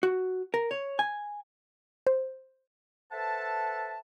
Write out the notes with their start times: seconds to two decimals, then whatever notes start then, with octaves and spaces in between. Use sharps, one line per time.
0.03 F#4
0.54 A#4
0.71 C#5
0.99 G#5
2.07 C5
3.12 A4 B4 C5 E5 F#5 A5